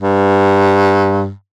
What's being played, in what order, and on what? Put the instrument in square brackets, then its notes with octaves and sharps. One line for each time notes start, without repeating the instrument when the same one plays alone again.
[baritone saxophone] G2